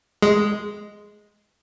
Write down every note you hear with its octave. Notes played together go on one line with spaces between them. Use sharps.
G#3